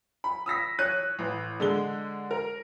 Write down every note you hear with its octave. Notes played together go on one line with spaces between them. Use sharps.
B5
D#6 E6 A#6 B6
C#5 F#6 D#7
A1
D3 G#3 G7
A#4